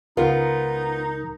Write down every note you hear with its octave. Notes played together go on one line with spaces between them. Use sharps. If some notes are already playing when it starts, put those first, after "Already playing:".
C#2 B3 D#4 F4 A#4